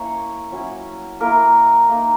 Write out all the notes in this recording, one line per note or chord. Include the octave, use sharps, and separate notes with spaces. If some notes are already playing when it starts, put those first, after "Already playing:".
Already playing: A#3 C#4 E4 C#5
F#3 C#4 E4
A#3 E4 A#4
A#3 D#4